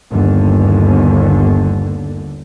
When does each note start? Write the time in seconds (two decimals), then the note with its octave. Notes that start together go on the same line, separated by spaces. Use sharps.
0.11 G1 D#2 D3